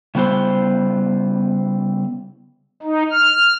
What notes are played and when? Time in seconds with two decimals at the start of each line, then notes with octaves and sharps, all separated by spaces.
0.15 C#3 G3 B3 E4 C5
2.83 D#4
3.11 F6